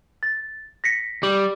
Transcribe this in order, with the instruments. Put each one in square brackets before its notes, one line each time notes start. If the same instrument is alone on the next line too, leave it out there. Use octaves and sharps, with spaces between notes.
[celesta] A6
A#6 B6 C#7
[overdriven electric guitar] G3 [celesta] D6 F#7